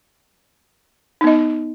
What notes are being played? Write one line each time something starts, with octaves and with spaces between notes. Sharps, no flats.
B3 D#4 D#5